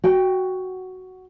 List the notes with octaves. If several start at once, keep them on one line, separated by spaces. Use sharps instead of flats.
F#4 G5